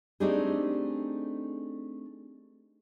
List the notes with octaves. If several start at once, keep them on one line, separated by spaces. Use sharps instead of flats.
A3 C4 D4 D#4 G4 G#4